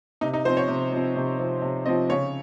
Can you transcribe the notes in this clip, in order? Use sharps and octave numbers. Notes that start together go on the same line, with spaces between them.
C3 D#4
D#4
F3 C4 C5
C#5
C3
F3 C4
C3
F3 C4
C3
F3 C4 D#5
C#3 C#5